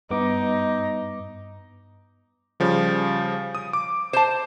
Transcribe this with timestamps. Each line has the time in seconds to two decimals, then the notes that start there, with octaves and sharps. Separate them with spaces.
0.11 G2 B3 D#4 D6
2.60 C#3 F3 G3
3.55 D#6
3.73 D6
4.13 C5 A5